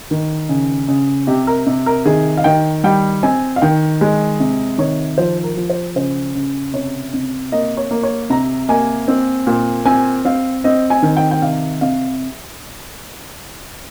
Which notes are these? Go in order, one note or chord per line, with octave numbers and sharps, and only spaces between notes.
D#3
C#3
C#3
C3 G4
A#4
C3
A#4
D#3 G#4
F5
D#3 G5
G3 G5
C4 G#5
F5
D#3 G5
G#3
C3
D#3 C#5
F3 C5
A#4
F3
C5
C#3 C5
C#3
C3 C#5
C3
A#3 D#5
C#5
A#3
C#5
C3 A#5
A#3 G#5
C4
A#2
C4 G#5
C4 F5
C4 D#5
G#5
D#3
G5
G5
C3 F5
C3 F5